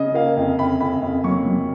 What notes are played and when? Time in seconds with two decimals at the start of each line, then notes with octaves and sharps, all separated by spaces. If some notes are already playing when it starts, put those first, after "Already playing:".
Already playing: C#3 D#5
0.14 A#3 F5
0.37 F2
0.59 F2 B5
0.80 F2 B5
1.02 F2
1.24 F#3 C#6
1.46 F#3